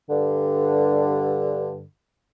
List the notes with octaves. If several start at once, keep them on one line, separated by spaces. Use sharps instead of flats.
G2 D3